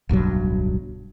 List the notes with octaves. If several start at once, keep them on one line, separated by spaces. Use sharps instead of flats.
D1 B1 G2 F#3